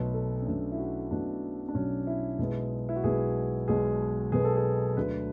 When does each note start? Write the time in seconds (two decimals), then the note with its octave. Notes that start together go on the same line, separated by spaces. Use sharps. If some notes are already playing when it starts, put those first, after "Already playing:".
Already playing: B1 B2 F#3 A3 B4
0.14 A4
0.42 C#4
0.46 B1 B2 F#3 A3 D4
0.72 E4
0.78 F#4
1.11 B1 B2 F#3 A3 D4
1.68 D4
1.75 B1 B2 F#3 A3 C#4
2.07 E4
2.39 B1 B2 G#3 B3
2.89 E4
2.96 F#4
3.03 B1 B2 G#3 B3 G#4
3.68 B1 B2 G#3 B3 G#4
4.32 B1 B2 G#3 B3 G#4
4.44 A4
4.57 G#4
4.97 D2 D3 F#3 A3 B4